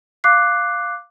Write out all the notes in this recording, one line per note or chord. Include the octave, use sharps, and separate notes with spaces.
F5 D6 F#6 C7